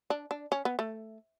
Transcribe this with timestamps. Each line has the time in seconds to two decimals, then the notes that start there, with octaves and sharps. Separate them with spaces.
0.10 D4
0.31 D4
0.52 C#4
0.65 B3
0.79 A3